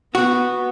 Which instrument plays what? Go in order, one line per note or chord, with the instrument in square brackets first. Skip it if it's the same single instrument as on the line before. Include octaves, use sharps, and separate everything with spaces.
[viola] B3 [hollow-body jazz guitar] F#4